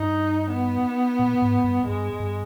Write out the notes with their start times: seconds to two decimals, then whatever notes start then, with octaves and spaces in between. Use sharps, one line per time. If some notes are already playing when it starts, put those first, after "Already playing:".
Already playing: G2 D#4
0.52 B3
1.19 A#2
1.42 G#2
1.64 G2
1.86 G2 G#3
2.20 G2